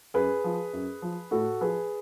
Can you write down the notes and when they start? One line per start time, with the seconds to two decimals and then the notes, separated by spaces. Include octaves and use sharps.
0.14 F#2 G#4 B4
0.44 F3
0.73 F#2
1.02 F3
1.31 A2 F#4 A4
1.61 F3 G#4 B4